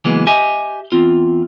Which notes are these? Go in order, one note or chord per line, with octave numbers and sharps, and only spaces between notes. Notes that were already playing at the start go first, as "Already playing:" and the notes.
C#3 E3 F#3 G#3 A#3 B3
G4 D#5 E5 G#5
E2 C4 F4